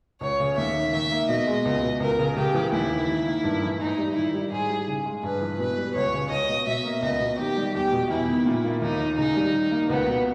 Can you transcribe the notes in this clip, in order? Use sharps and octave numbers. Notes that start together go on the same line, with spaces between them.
C#2 C#5
C#3
D#2 E5
D#3
D#3 E5
A#3
B2 D#5
G#3
C#2
B2
C#2 A#4
C#3
C#3 G4
E3
D#2 E4
D#3
D#3
A#3
G2
E3
G#2 D#4
G3
D#3 E4
G3
G#2 G#4
G3
C#3
G#3
G2 B4
E3
B2 B4
G3
C#2 C#5
C#3
C#2 D#5
B2
B2 E5
A#3
C#2 D#5
B2
D#3 G4
G3
E2 G4
B2
E2 E4
D#3
A#2
A#3
D#2 D#4
D#3
C#3 D#4
G3
D#3
A#3
C#2 B3
B2